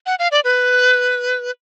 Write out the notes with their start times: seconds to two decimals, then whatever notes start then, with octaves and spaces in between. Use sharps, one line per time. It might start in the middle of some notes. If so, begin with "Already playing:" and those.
0.06 F#5
0.19 F5
0.31 D5
0.44 B4